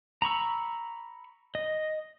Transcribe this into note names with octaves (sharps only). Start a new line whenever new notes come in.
A#5 B5 C#6 E6
D#5